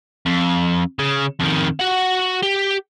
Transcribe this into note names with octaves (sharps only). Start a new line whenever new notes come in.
F2
C#3
F2 D#3
F#4 F#5
G4